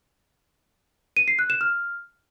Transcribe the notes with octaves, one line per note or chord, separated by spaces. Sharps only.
D#7
C7
F#6
E7
F6